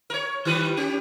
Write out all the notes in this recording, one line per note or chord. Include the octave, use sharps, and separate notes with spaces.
A#4 C#5
D#3 G3 B4
C#4 G4